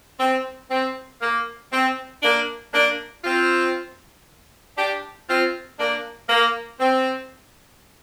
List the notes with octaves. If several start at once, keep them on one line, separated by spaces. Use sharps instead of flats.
C4
C4
A#3
C4
A#3 D4
A#3 D4
C4 F4
D4 G4
C4 F4
A#3 D4
A#3
C4